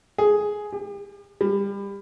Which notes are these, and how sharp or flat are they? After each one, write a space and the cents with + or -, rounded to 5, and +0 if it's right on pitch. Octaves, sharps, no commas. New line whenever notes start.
G#4 +5
G4 +40
G3 +25